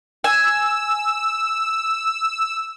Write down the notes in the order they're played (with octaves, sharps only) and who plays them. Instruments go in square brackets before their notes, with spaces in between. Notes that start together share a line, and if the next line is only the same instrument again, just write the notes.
[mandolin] G#5 [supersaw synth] E6